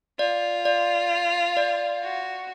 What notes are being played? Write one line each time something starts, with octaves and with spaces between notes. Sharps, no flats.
F4 D5
D5
D5
F#4